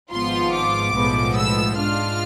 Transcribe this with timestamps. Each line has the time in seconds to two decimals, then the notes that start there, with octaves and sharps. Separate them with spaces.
0.11 G#1 G#2 F3 B3 F4 C6
0.53 D6
0.96 B1 A2 F3 G#3 B3
1.37 E6
1.78 G#2 G#3 D4 F4 F6